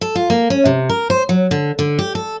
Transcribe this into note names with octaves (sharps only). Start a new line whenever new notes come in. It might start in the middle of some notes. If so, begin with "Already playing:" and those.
A4
F4
A#3
C#4
C3
A#4
C5
F#3
D3
D3
G4
A4